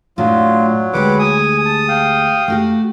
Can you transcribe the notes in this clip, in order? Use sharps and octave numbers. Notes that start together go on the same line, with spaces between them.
A2 F#3 D4 F4
D2 G#3 G4 B4 F#5 D6
G#5 D#6
A5
F5 G5
A3 F#4 G4